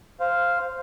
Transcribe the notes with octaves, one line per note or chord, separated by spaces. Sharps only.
C5 F5